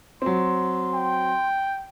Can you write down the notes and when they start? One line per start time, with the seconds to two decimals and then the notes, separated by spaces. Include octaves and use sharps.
0.22 F#3 C4 C6
0.94 G5